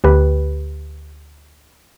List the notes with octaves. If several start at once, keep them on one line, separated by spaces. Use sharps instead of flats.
D2 G4 B4